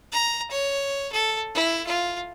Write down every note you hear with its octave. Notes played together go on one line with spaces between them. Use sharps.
A#5
C#5
A4
E4
F4